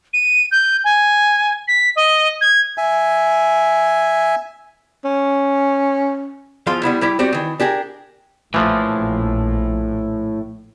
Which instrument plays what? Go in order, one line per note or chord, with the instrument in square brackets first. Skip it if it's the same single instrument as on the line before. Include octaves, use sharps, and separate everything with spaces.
[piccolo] D#7
G6
G#5
B6
D#5
G#6
[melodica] E5 G#5
[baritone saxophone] C#4
[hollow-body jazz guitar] E2 F3 F4 F5 C6
G3 B3 E4
G3 E4 G4
G3 C4 F#4 G4 D5
D#3 E3
D4 G4 G#4 A#4
[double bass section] A#1 [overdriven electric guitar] A2 [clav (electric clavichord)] E3 F3